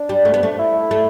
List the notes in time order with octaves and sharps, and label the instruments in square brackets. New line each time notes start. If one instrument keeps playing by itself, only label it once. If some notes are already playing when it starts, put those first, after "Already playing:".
Already playing: [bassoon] D4
[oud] G3
A3
B3
A3
[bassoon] E4
[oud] A3